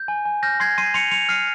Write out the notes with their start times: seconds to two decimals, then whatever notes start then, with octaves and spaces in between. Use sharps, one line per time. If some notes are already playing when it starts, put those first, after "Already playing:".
Already playing: G6
0.08 G#5
0.25 G#5
0.43 F6 G6 A#6
0.60 C6 G#6 C7
0.78 C6 C7 D#7
0.94 C6 C#7 F7
1.11 C6 C#7 F7
1.29 F6 C7 D#7